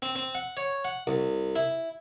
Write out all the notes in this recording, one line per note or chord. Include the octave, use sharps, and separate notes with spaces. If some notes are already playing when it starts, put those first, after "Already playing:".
C4
C4
F#5
C#5
F#5
C2
E4